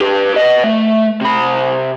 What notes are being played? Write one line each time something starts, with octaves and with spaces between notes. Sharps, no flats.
G4 B4
B4 D#5
A3
C3 B5